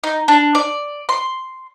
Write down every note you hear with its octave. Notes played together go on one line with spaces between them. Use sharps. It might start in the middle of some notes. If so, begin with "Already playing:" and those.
D#4
D4
D5
C6